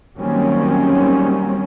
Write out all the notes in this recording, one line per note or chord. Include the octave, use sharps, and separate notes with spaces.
D#3 F#3 G3 A#3 C4 C#4